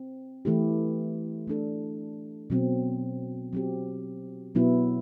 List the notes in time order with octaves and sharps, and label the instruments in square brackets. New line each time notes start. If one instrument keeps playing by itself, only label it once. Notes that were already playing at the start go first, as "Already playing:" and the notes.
Already playing: [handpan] C4
E3 A3 E4 G4
A3 D4 A4
B2 F#3 C4
F#3 C4 G4
B2 F#3 B3 E4